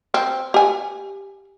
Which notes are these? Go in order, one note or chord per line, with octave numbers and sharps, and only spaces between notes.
C4
G4 G#5